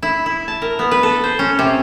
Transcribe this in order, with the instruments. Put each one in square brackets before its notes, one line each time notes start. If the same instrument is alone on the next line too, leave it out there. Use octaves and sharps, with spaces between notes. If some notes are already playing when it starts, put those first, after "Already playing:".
[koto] E4
E4
A5
A#4
B3
B4
A4
C5
C#4
C3